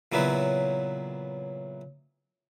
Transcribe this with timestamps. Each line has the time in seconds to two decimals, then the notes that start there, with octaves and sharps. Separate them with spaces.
0.12 A#2 C#3 E3 F#3 B3 E4